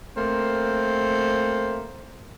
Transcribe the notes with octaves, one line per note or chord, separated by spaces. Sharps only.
A3 A#3 C4 A#4 C5